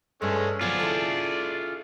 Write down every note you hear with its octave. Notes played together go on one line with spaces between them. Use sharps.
G2 G#3 A3 C#4
F3 F#3 B3 F4 G#4 D5
E4 A4